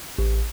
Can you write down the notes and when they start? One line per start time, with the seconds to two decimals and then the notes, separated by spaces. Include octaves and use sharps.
0.18 A1